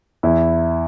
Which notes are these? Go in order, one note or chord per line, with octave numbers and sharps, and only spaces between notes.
E2 E4